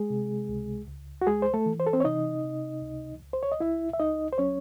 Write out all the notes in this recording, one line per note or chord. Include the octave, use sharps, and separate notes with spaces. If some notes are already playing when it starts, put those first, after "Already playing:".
Already playing: G#3 G#4
C3
C#2
C#2
F#4
G#3 G#4
C5
A3 A4
E3
C5
A4
C4 C5
C#5
C3 D#4 D#5
C3
C#2
C#2
C5
C#5
D#5
C#2 E4 E5
E5
C#2 D#4 D#5
C5
F#3 C#4 C#5